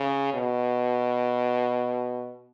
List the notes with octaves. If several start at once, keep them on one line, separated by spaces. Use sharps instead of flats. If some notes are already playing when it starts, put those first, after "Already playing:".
Already playing: C#3
B2